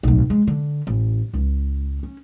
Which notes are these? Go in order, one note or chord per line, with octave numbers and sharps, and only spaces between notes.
D1 B1
G#3
D3
A1
C#2
C#4